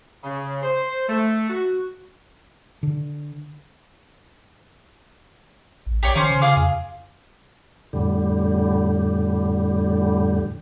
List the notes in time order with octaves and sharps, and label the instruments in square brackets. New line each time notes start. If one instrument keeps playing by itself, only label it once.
[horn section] C#3
C5
A3
F#4
[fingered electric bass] D3
[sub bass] A1
[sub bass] A#1 [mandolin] G4 C#5 D5
[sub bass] D#3 [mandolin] C#4 C5
[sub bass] C#3
[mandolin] F4 G#4 D6
[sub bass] F2
[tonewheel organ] F2 A2 D3 G3